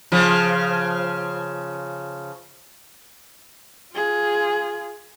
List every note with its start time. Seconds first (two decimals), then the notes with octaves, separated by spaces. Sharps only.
0.12 C#3 F3
3.93 F4 G#4